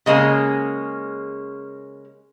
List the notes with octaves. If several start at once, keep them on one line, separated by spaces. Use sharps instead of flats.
C#3 G#3 A#3 C#4